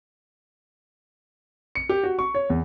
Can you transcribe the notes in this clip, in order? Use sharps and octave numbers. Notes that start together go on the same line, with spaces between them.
C#7
G4
F#4
C#6
C#5
E2